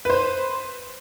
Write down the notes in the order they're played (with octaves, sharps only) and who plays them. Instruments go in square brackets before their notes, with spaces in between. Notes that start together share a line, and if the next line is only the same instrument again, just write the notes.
[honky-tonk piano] B4 C5